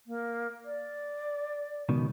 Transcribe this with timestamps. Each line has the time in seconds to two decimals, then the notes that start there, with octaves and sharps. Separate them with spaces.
0.07 A#3
0.65 D5
1.89 C#2 B2 D#3